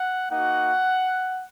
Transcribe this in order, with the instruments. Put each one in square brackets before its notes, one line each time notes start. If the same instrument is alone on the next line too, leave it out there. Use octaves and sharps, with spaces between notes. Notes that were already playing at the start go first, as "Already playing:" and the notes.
Already playing: [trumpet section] F#5
A#3 D#4 F#4 F#5